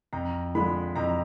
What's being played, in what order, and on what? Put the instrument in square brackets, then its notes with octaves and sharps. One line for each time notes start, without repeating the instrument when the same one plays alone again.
[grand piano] F2 A#5
D3 F3 G#3 B5
F2 A#5